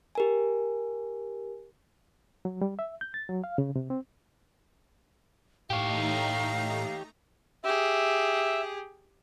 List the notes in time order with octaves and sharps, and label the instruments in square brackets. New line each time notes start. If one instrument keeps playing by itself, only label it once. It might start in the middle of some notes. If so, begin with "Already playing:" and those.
[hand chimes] G4 A#4 G#5
[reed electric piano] F#3
G3
E5
G6
A6
F#3
F5
C#3
C3
C4
[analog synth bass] A2 [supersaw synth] A3 D#4 A#5 [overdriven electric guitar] G4 C#5 [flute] F5
[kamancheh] G4 G#4 [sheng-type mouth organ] E5